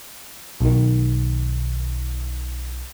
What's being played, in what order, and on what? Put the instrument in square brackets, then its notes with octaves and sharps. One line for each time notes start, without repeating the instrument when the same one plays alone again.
[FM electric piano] B1 D#3